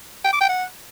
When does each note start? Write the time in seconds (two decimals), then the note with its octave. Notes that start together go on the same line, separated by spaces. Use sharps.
0.25 G5
0.33 D6
0.41 G5
0.49 F#5